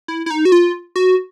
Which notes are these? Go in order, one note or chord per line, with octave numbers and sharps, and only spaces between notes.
E4
E4
D#4
F#4
F4
F#4